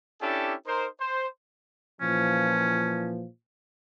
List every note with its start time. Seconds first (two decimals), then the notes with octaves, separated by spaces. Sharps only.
0.21 C#4 D4 E4 G4 A4
0.67 D#4 A#4 C5
0.99 C5
2.01 A#2 E3 F3 C#4